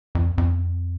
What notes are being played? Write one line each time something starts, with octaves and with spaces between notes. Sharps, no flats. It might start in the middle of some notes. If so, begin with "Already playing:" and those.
F2
F2